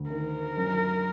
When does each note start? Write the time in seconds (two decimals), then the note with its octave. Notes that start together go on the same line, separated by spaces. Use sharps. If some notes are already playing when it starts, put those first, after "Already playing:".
Already playing: D2
0.10 D#3 A#4
0.57 F#2